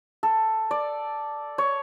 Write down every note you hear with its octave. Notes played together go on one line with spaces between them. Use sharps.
A4
D5
C#5